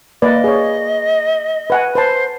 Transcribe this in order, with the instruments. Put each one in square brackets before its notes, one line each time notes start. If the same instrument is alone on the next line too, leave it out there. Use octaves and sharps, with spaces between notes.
[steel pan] A#3 B4 D5 [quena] D#5
[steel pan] G#4 C#5
B4 F#5 G#5
[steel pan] B4 A5 [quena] C5